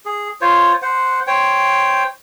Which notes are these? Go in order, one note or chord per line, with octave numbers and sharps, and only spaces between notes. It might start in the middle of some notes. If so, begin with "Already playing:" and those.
G#4
F4 C5 C#5
C5 F#5
C5 C#5 G5